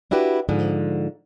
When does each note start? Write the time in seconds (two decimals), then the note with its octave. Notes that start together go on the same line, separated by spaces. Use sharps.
0.11 D4 E4 F#4 G4 B4
0.49 G#2 D3 F3